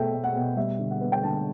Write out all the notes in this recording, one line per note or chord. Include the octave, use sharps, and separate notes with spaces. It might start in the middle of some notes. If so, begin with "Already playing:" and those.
Already playing: B2 A3 E5 G5
A3
F#5
B2
G3 E5
D3
F#5
B3
G5
D3 A5